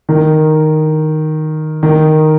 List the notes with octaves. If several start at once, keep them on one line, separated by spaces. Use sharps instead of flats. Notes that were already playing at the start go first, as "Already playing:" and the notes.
D#3
D#3